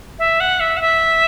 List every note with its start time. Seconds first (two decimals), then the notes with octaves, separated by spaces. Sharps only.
0.19 E5
0.40 F#5
0.60 E5
0.77 F#5
0.81 E5